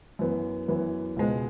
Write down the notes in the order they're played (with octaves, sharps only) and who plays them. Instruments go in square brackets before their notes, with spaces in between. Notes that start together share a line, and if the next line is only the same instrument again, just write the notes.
[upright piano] F#2 E3 B3
F#2 E3 B3
C#2 B2 G#3 B3